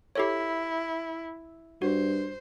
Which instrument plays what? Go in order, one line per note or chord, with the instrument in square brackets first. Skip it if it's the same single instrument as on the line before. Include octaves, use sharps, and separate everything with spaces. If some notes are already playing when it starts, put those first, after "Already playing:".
[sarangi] E4 [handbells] G4 A4 C#5
[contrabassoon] G2 [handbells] F#4 [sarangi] C5